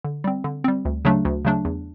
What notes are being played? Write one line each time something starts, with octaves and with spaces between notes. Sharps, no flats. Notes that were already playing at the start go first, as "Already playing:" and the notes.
D3
G3 C4
D3
G3 C4
D2
C#3 F#3 A3 D4
D2
C#3 F#3 A3 D4
E2